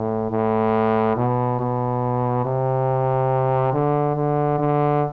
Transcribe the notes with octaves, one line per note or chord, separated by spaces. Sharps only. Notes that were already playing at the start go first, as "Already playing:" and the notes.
Already playing: A2
A2
B2
B2
C3
D3
D3
D3